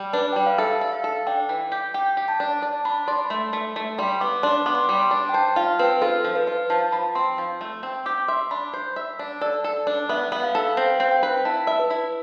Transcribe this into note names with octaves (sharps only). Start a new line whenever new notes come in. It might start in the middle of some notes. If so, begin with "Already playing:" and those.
Already playing: G3
D4 B4
G3 G5
F5
A4 E5
A4
F5
A4
D4 G5
E3
G4
G4 G5
G4
A5
D4
D5 A5
D4 B5
D5 C6
B5
A3 C6
A3
A3
G3 C6
B3 D6
D4 C6
B3 D6
C6
G3 D6
C6
D4
G5
C5 A5
F4 F5
C4 B4
F4 A4
F3
B4
F4
F3 A5
F3 B5
C4 C6
F3
A3
C4
G4 D6
E5 C6
D4 B5
C5
E5
D4
A4 D5
A4
D4
B3 E5
B3
F5
A4
C4 F5
C4
G5
B4
E4 A5
E5
B4
E4